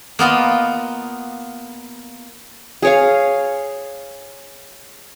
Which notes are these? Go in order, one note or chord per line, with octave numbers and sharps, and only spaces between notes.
A#3 B3 F4 D#5
G#4 C#5 F5